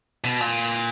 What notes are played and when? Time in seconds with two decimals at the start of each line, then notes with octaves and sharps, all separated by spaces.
0.24 B2
0.40 A#2